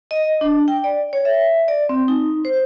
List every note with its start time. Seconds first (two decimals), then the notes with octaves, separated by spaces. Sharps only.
0.11 D#5
0.41 D4
0.68 G5
0.84 D5
1.13 C#5
1.25 E5
1.68 D5
1.89 C4
2.08 D#4
2.45 C5